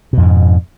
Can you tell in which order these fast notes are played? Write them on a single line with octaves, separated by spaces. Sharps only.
B2 F2 G#2